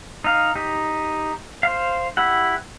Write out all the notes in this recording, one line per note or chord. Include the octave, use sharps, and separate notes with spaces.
D#4 F5
D#4 G4
C5 F5
E4 G4 F#5